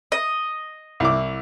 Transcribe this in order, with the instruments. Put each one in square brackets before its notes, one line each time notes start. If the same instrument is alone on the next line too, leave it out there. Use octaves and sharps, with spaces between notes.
[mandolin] D#5
[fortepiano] C2 E4 D6